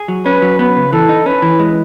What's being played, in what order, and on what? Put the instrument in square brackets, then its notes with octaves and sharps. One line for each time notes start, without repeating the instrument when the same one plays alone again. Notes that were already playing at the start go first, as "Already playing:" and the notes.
Already playing: [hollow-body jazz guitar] G#4
F#3
[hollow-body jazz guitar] C#4 [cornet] B4
[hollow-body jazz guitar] F#3
[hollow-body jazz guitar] B3 [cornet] B4
[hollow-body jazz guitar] C#3
[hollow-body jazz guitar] E3 [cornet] A4
[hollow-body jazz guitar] D#4
[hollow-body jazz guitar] C#4 [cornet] B4
[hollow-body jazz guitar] E3
G#3